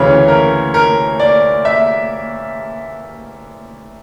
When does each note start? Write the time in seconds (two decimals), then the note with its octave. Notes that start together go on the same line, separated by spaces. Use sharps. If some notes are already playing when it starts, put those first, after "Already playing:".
Already playing: D2 C#3 E3 C#5
0.28 A#4
0.74 A#4
1.20 D5
1.65 E5